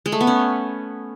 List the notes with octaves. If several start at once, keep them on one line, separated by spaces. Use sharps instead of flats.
G#3
A3
B3
C#4